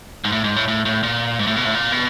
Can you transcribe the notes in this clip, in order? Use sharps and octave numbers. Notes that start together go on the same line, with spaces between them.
G#2
A2
G#2
A2
A2
A2
A#2
G#2
A2
B2
A2
A#2
B2